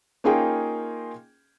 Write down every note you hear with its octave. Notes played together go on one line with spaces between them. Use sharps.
A#3 C#4 D#4 F4 G#4 G5